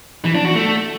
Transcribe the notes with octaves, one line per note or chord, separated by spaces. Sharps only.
E3
D4
F#4
A3